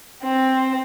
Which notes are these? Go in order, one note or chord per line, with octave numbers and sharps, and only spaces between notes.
C4